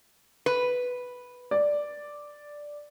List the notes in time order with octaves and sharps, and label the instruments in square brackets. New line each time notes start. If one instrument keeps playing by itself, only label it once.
[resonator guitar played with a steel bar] B4
[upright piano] D5